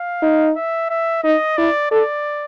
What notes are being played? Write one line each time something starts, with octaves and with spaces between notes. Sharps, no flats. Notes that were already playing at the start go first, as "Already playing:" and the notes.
Already playing: F5
D#4
E5
E5
D#4 D#5
E4 D5
A4 D5